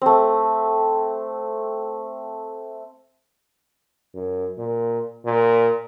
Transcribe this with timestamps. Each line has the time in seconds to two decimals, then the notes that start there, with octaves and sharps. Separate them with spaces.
0.02 A3 C4
4.14 F#2
4.58 A#2
5.25 A#2